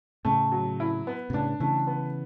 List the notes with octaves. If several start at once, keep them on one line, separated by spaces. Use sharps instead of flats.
A2 C#3 A3
F#3
E4
B3
B2
A2 C#3 D4
C#3 E3 A3
B3